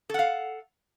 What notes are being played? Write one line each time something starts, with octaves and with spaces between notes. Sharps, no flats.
A4 F5 F#5